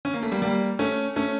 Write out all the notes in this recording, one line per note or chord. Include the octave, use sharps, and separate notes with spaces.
C#4
A#3
A3
G3 A#3
G3 A#3
A3 C#4
A3 C#4